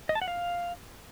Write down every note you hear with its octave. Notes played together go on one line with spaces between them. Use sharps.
D#5
A5
F#5
F5